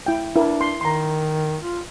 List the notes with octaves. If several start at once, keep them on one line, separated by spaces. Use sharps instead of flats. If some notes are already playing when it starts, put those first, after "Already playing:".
E4 G5
D4 E4 A#4
C6
D#3 A#5 C6
F4